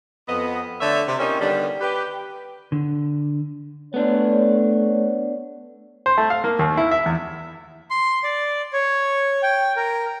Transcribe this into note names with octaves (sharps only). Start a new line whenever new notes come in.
F2 B3 D#5
D3 A3 C#5 E5
C3
A#3 C4 C#4 D#4 F4 G4
D3 D#3 G3 B3 D4
G4 B4
D3
A3 B3 D4 C#5
C5
A3
F5
A#3
D#2
E4
E5
E2
C6
D5
C#5
G5
A#4